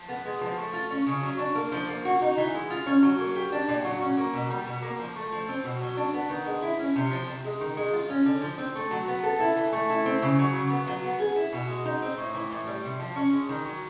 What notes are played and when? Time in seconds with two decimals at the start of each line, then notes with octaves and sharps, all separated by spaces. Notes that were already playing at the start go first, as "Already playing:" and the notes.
Already playing: F3
0.09 B3
0.25 G#3
0.41 F3
0.57 A3
0.73 F4
0.91 C#4
1.06 C#3
1.23 F#3
1.39 D4
1.55 A#3
1.72 F3
1.88 A#3
2.05 F#4
2.22 D#4
2.37 E3
2.54 G#3
2.70 F4
2.86 C#4
3.02 F#3
3.19 A#3
3.35 G4
3.52 D4
3.68 A#2
3.84 F#3
4.01 C#4
4.17 A#3
4.34 B2
4.50 G3
4.66 B2
4.82 A#3
4.99 F3
5.16 A3
5.32 F3
5.48 C4
5.64 B2
5.81 F#3
5.97 D4
6.14 B3
6.29 D#3
6.46 G#3
6.62 E4
6.79 C#4
6.96 C3
7.11 F3
7.27 C3
7.45 G#3
7.61 D#3
7.77 G#3
7.93 F4
8.10 C#4
8.26 D3
8.42 F3
8.58 C4
8.75 A3
8.91 F#3
9.08 B3
9.23 A4
9.40 E4
9.56 E3
9.72 A3
9.90 E4
10.05 C4
10.22 C#3
10.39 F#3
10.55 C#3
10.70 B3
10.87 F#3
11.04 B3
11.20 G#4
11.36 E4
11.53 B2
11.69 G#3
11.85 D#4
12.02 C4
12.18 A2
12.34 E3
12.51 A2
12.67 G3
12.84 C3
13.00 F3
13.16 C#4
13.33 G#3
13.49 D#3
13.65 F#3